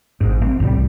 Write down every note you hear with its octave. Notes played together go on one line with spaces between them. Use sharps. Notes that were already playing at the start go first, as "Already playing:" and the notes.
G#1 G#2
A3 C4
C2 A2 F3 G3